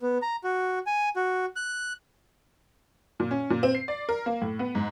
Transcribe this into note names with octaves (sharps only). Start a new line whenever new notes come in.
B3
A#5
F#4
G#5
F#4
F#6
A#2
C#4
A#2
C4
C7
D5
A#4
A#3
A2
B3
G#2